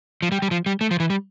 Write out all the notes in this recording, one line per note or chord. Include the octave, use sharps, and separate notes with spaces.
F3
G3
G3
F3
G3
A3
F3
E3
G3